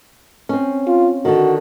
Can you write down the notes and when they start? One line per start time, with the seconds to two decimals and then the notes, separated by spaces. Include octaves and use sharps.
0.49 C4 C#4
0.87 F4
1.25 D3 D#3 F#4